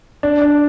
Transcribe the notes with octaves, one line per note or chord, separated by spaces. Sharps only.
D4
D4